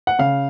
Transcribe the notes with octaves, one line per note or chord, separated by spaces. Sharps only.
F#5
C#3 F5